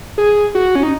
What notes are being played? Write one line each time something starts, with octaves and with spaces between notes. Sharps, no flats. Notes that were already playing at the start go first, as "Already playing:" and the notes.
G#4
F#4
C#4
D#4